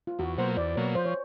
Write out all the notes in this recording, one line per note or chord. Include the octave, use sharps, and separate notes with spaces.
F4
E2 F#4
B2 F#3 A#3 C5
E2 D5
B2 F#3 A#3 C#5
F3 C5
C#5